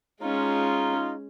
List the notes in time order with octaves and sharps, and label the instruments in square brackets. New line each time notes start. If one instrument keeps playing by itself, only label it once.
[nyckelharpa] G#3 C#4 [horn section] D#4 F4